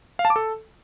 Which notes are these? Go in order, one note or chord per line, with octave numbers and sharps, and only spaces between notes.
F5
A5
D6
A4